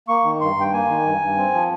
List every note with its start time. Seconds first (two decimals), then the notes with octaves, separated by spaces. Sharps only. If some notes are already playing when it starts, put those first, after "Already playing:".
0.08 A#3 C#6
0.24 D#3
0.41 G2 C6
0.56 G2 G5
0.73 A#3 G#5
0.89 D#3
1.06 G2
1.21 G2
1.37 C4
1.53 F3